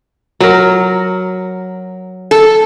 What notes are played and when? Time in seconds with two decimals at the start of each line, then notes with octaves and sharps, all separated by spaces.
0.40 F#3 A#4
2.31 A4